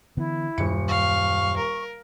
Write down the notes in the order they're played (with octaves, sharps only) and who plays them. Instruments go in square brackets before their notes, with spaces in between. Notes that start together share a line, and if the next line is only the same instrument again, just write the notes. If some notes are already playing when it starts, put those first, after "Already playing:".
[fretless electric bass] D3 E3 B3 [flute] E4
[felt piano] D#1 C#7 [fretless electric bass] F#2
[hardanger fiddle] F5 [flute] C#6
[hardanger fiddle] A#4